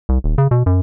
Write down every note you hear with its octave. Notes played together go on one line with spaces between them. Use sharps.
C2
D#1
C#3
B2
F#2